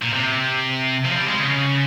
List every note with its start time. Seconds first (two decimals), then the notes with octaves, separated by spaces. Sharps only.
0.02 A#2
0.13 C3
1.05 F3
1.11 G#3
1.16 G3
1.28 G#3
1.39 C#3